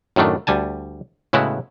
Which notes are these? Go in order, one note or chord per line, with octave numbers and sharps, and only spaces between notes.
F#2 A2 D#3 A3 D4
D2 G3 G#5 A5
A2 C#3 G#3 B3 E4 F#4